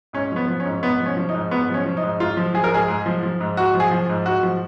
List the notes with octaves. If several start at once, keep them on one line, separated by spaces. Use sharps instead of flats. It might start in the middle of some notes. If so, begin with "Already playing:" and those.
G#2 C#4
F3 B3
F3
C#4
G#2
G#2 B3
F3
C#4
F3
D#4
G#2
G#2 B3
F3
C#4
F3
D#4
G#2
G#2 F4
F3
F3 G#4
A#4
G#2 G#4
G#2
F3
F3
G#2
G#2 F#4
F3
G#4
F3
G#2
G#2 F#4
F3